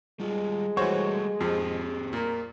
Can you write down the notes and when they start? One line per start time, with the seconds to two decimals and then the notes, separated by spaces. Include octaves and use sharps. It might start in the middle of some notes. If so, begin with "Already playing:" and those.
0.20 G3 G#3 F4
0.77 E3 G3 A3 F#4 C5 C#5 C#6
1.41 F2 F3 C4 G4 G#4
2.13 A#2 A#3